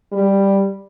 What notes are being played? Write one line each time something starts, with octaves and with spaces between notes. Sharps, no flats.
G3